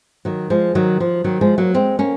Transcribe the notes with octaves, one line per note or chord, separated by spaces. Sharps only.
D#3 F#3
F3 G#3
D#3 F#3
F3
D#3 F#3
F3 G#3
F#3 A#3
G#3 C4
A#3 C#4